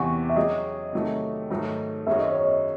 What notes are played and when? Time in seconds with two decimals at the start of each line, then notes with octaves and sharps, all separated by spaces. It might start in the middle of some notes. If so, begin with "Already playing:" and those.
Already playing: E2 C3 E3 F#5 G#5 C#6
0.29 E5
0.36 F#3 C#4 G#4 D#5
0.93 C3 D#3 F#3 A3
1.50 G#2 D#3 F#3 A3 D#4
2.07 F#2 D#3 G#3 C#4 F#4 E5
2.19 D#5
2.32 C#5
2.44 D#5